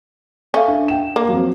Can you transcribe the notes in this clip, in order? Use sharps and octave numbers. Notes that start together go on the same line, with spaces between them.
C#4 A4 E5 F5
D4
G5 E7
A#3
F2 F#3